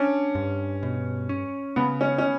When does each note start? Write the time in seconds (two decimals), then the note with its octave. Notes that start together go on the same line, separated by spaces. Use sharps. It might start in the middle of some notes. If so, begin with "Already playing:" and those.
Already playing: C#4 D4
0.35 G2
0.83 B2
1.29 C#4
1.76 C#3 B3
2.01 C#4
2.18 C#4